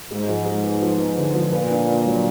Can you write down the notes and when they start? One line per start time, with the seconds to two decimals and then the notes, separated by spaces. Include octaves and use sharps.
0.11 G#2 G#3
0.29 F3
0.46 G#3
0.64 B3
0.82 F3
1.00 B3
1.18 D3
1.35 F3
1.52 A#2 B4
1.71 D4
1.88 D4
2.06 F#3